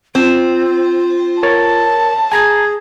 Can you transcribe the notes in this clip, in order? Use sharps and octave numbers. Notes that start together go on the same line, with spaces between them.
C4 F4
A#4 C#5 A5 A6
G#4 G#5 A#5 G#6